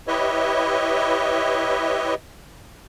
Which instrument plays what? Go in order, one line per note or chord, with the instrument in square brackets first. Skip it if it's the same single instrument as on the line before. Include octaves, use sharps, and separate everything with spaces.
[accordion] E4 G4 B4 C#5 D#5 E5